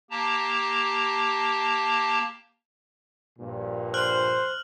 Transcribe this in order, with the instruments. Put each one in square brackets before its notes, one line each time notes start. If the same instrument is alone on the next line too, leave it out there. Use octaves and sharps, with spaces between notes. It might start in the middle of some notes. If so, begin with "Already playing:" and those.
[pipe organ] A#3 G4 A5 A#5
[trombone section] A#1 G2 A#2
[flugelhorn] C5 [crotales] F6 F#6 F#7